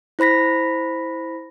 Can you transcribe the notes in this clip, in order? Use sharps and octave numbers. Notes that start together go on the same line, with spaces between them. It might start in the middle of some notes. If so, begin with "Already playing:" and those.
E4 C5 B5 A#6 B6